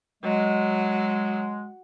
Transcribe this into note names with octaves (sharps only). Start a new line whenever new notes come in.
F#3 G#3